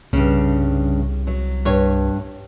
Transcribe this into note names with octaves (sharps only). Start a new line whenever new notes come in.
C2 G2 C#3
F#3
G2 C#5